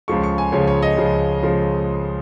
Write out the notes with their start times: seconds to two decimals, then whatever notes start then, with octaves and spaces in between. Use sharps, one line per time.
0.08 C#2 C#3 F3 G#3 C#6
0.24 C#6
0.38 G#5
0.52 C#2 C#3 F3 G#3 C#5
0.67 C#5
0.82 D#5
0.97 C#2 C#3 F3 G#3
1.42 C#3 F3 G#3